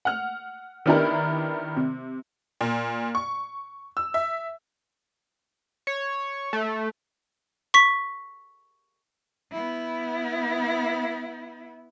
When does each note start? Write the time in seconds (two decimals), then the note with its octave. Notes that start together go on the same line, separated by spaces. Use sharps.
0.05 F#5 F6
0.86 D#3 B3 D4 E4 G4 A#4
1.76 C3
2.61 A#2
3.15 C#6
3.97 E6
4.14 E5
5.87 C#5
6.53 A3
7.74 C#6 B6
9.52 B3 E4